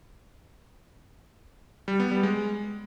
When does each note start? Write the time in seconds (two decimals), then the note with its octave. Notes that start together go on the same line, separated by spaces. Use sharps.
1.88 G3
2.00 B3
2.11 G3
2.23 G#3